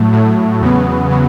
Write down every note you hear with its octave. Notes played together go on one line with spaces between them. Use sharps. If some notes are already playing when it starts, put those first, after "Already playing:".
Already playing: A2 F#3 A3
A2 F#3 A3
E2 C#3 F#3 B3
C#3 F#3 B3